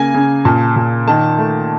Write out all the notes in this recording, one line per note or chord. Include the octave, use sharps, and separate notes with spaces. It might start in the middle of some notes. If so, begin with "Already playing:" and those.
Already playing: C#3 A#3 G#5
C#3
A#2 A5
A#2
D#3 A5
A3